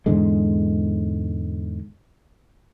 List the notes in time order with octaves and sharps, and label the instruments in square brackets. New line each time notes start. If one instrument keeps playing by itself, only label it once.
[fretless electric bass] E2 G#2 D3 G#3